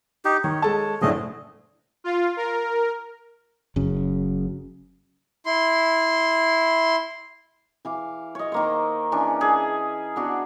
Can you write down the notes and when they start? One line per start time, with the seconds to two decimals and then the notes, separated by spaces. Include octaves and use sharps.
0.25 D#4 G4
0.44 D#3 C#5
0.62 G#3 A4 A5
1.02 F#1 A2 D3 A3 G#4 D#5
2.04 F4
2.37 A#4
3.76 F#1 F#2 C#3
5.46 E4 C6
7.85 E3 F5 D6
8.35 C#5 D#5
8.52 D#3 A#3 C5
9.12 E3 C#4 D4
9.41 C#4 G#4 A5
10.16 B3 D4 F#4